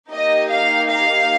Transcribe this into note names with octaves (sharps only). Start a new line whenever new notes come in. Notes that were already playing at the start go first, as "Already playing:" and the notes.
A#3 D#4 G4 D#5
F5
F5